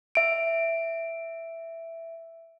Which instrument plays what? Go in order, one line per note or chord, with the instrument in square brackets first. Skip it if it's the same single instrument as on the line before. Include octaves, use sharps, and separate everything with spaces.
[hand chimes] E5 D7